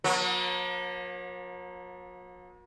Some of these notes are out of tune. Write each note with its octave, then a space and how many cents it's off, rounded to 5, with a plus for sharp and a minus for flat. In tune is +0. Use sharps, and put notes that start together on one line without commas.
F#3 -40 A#3 +40